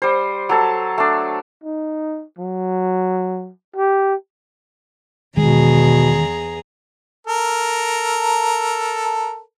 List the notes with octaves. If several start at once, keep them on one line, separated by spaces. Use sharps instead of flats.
G3 C5
F#3 A4 A5
A3 D4
D#4
F#3
G4
E2 B2 D#3 G#3 G#4 A#5
A4 A#4